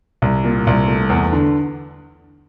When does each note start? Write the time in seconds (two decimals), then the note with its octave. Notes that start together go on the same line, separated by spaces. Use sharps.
0.22 C2
0.44 A#2
0.67 C2
0.88 A3
1.10 E2
1.32 D3